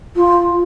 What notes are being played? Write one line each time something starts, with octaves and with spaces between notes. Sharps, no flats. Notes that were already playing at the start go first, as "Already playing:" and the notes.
F4